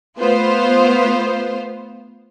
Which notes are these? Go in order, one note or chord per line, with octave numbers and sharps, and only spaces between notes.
A3 B3 F4 C5